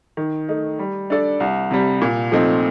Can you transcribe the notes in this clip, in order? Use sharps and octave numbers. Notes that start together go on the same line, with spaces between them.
D#3
A3 D#4
G3
D4 A4 D5
C2
C3 G3
A#2
F3 A3 C4 D#4